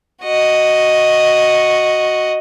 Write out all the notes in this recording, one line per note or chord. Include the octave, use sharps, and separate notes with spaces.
F#4 D#5